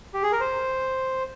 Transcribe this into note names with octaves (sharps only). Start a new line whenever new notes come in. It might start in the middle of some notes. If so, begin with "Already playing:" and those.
G4
G#4
A#4
C5